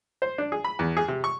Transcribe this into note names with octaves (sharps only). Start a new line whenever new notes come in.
C5
D4
G#4
B5
E2
G#4
C3
C#6